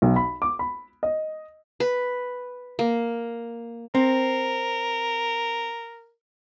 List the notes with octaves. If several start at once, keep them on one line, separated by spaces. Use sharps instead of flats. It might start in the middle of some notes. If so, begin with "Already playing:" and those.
B1
B5
D6
B5
D#5
B4
A#3
C4 A#4